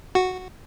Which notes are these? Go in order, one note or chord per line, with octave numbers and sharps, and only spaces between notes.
F#4